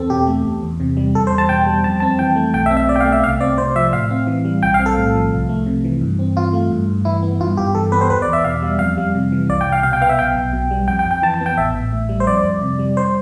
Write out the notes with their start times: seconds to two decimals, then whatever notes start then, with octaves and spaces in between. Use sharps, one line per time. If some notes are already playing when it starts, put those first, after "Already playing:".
Already playing: E2 C4 A4
0.10 B2 G4
0.27 A3
0.45 E2
0.63 E2
0.80 C3
0.97 G3
1.14 E2 A4
1.27 C5
1.32 E2
1.38 A5
1.49 B2 G5
1.67 G3
1.84 F2 A5
2.00 C4 A5
2.19 E3 G5
2.36 A3
2.53 B1 G5
2.66 E5
2.71 C4
2.77 E5
2.89 B2 D5
2.96 G5
3.00 F5
3.05 A3
3.12 E5
3.24 C2 F5
3.41 C4 D5
3.58 C3 C5
3.76 F3 E5
3.93 A2 F5
4.10 C4
4.27 E3
4.45 G3
4.63 B1 G5
4.74 F5
4.79 C4
4.86 A4
4.97 A2
5.15 F3
5.32 C2
5.49 A3
5.66 C3
5.84 E3
6.01 G2
6.19 C4
6.36 E3 F4
6.53 A3
6.71 G2
6.88 G2
7.05 E3 E4
7.23 B3
7.41 G2 F4
7.57 G2 G4
7.75 E3 A4
7.92 B3 B4
8.01 C5
8.10 E2 B4
8.22 D5
8.28 E2
8.33 E5
8.44 B2 F5
8.63 G3
8.79 F2 F5
8.97 G3
9.15 C3
9.32 E3
9.49 C2 D5
9.61 G5
9.66 C2
9.72 F5
9.83 B2 F5
9.93 G5
10.01 B3 F5
10.09 E5
10.19 B1 G5
10.35 B1
10.53 B2
10.71 G3
10.88 F2 G5
10.99 G5
11.05 F2
11.11 G5
11.22 E3 A5
11.34 A5
11.41 B3
11.46 G5
11.57 A1 E5
11.75 A1
11.93 A2
12.09 G3
12.20 C5
12.27 F2 D5
12.44 F2
12.62 C3
12.79 G3
12.97 C5